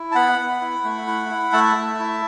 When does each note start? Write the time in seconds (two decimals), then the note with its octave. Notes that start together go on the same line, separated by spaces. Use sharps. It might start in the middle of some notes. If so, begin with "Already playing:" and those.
Already playing: E4
0.12 A5
0.15 B3 F#5 B5
0.39 B3
0.61 E4
0.84 A3
1.07 E4
1.30 E4
1.53 A3 E5 A5
1.76 A3
1.99 E4